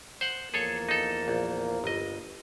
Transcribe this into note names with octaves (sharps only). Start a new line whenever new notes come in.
C5 F#5
E2 F3 A#3 G#4 A4 C#5
D#4 A4
A#1
G1 D#5